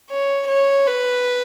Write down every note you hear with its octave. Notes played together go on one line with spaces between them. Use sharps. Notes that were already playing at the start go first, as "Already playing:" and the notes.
C#5
C#5
B4